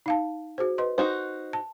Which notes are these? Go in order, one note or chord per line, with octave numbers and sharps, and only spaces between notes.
D#4 F5 A5
F#4 G#4 C5
B4 D#5 C6
D#4 F#4 C5
A5